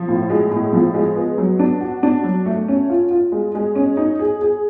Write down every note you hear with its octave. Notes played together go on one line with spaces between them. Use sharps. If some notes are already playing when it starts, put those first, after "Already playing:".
Already playing: F3
A2
G#3
A2
F3
G#3
B3
F#3
D4
F#4
D4
F#3
A3
C#4
F4
F4
G#3
G#3
C#4
D#4
G#4
G#4